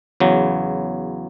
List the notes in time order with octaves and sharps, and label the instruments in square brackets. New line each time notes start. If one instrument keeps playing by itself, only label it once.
[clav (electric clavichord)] E2 C#3 F#3